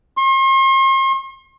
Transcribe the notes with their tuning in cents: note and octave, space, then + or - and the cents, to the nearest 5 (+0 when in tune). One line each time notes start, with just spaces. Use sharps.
C6 +45